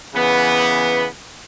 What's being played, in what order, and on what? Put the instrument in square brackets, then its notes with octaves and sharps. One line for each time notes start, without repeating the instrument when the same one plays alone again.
[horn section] C#3 E3 B3